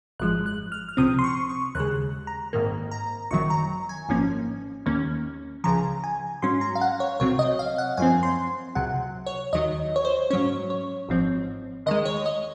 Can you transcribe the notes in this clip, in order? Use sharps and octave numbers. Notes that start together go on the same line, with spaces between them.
G#1 F#2 F3 G#3 F#6
F#6
F6
F6
C#2 C3 F3 C4 D#6
C6
C#6
C#6
D#2 C#3 G#3 F#6
A#5
G#1 G#2 D#3 A#3
A#5
G#1 F#2 D#3 F#3 C#6
A#5
G#5
G#1 G#2 F3 A#3 C#4
D#2 D#3 A#3 C#4
C#2 C#3 F3 A#5
G#5
G#2 F#3 C#4 C6
A#5
F5
F#5
C#5
C2 C3 F#3 C4 C#5
D#5
F5
F#5
F#2 F3 C4 G#5
C6
C#2 C3 F#3 F#5
C#5
D#2 D#3 F#3 D#5
C#5
C5
G#2 F#3 C#4 C#5
C#5
G#1 G#2 F3 C4
D#2 D#3 G#3 D#5
C#5
D#5